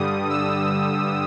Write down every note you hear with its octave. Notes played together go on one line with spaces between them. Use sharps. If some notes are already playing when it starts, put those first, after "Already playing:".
Already playing: G2 D3 G3 D#6
E6